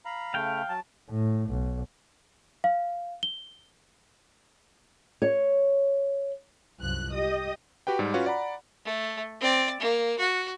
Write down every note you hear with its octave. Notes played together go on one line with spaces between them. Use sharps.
F5 A#5 B5
C#3 A3 F5 G5
F#3 A5
A2
B1
F5
G7
C#5
C2 F#2 F3 F#6
G4 D#5 D#6
F#4 G4 B4 G5
G#2 G3
C#4 F4 F#4 B4 C#5
D5 F#5 A#5 B5
A3
C4 D5
A#3
F#4